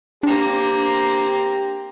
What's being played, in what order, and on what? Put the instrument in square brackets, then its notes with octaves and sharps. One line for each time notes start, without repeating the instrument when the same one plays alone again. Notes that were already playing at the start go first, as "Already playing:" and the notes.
[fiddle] A#3 C4 [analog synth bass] D4 [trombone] G4